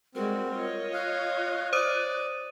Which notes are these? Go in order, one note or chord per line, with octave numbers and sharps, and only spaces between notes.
G3 G#3 C4 F#4 A#4
F4 C#5 D#5
F5 F#6
C5 D5 D#6 D#7